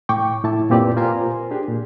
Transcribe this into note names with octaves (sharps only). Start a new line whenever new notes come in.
A2 G5 C#6 D6
A2 E4 A5
F#2 A#2 C4 G4 B4 D5
F4 A#4 C5 G#5 A#5 C6
D4 G4 G#4
A#2